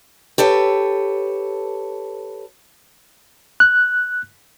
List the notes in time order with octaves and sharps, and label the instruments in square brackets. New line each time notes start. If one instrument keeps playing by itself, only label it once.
[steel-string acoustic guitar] G4 A4 B4 C#5
[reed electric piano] F#6